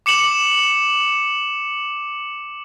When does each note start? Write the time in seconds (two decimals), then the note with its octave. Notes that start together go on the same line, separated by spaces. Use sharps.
0.06 D6 C#7 E7 F#7